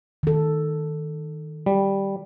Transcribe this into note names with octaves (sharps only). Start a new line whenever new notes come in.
D#3 A4
G3